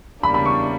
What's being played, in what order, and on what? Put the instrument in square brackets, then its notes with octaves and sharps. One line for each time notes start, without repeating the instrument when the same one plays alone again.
[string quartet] E2 C#3 G3 A#3 D4 [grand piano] B5
[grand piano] B5
C#6